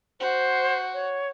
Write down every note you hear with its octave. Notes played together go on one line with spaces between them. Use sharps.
F#4 C5
C#5